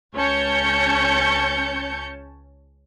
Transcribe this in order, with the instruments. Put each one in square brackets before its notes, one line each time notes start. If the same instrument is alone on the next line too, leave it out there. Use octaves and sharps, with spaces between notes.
[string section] C#2 C#4 C#5 A5 G6 C#7